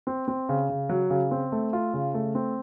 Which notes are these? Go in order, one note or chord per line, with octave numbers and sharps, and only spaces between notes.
C4
C4
C#3
C#3
F#3
C#3
C4
A3
F4
C#3
A3
C4